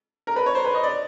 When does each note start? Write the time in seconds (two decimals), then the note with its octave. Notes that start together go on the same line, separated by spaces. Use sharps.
0.27 A#4
0.36 B4
0.46 C#5
0.55 C5
0.65 B4
0.74 D#5
0.83 D5